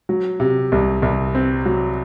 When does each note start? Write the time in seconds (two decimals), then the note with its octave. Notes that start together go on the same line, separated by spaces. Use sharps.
0.09 F#3
0.40 C3
0.72 C2
1.02 C2
1.35 C4
1.65 F#3